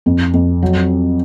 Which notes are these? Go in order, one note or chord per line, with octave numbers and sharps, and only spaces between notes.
F2
F2
F#3